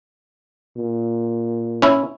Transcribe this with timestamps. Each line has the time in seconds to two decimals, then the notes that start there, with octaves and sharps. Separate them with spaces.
0.77 A#2
1.82 C#4 E4